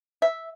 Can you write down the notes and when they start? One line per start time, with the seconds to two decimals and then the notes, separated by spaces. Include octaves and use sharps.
0.22 E5